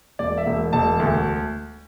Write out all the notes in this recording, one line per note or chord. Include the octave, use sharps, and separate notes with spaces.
E1 D5
E5
E1
E1 A5
D2